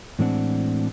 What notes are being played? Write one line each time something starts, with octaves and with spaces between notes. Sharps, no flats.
A2 E3 G#3 C4 D4 F#5